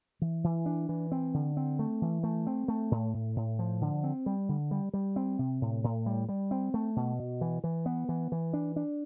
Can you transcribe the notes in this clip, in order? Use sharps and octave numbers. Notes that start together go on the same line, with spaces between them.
E3
E3
D4
E3
C4
D3
C4
A3
E3
A3
C4
A3
A2
A2
A2
F3
D3
C4
G3
D3
G3
G3
C4
C3
A2
A2
G3
G3
C4
A3
B2
B2
E3
E3
B3
E3
E3
D4
D4